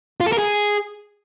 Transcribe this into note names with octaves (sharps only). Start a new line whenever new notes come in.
F4
A4
A#4
G#4